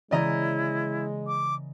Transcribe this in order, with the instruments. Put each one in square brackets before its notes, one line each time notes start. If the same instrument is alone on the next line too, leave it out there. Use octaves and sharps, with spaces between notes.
[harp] C#3 E3 A#3 [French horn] G#3 [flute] E4 [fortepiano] D5 D#5 A#5
[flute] D6